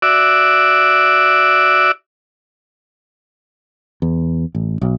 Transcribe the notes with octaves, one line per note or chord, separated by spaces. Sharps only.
F#4 D5 E5
E2
A1
B1